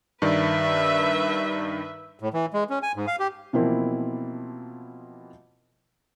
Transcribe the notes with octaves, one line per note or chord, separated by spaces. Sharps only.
G2 D#3 B4 D5 E5
A2
E3
G#3
C#4
G#5
G#2
F5
G4
B2 E3 F3 A#3 C4 E4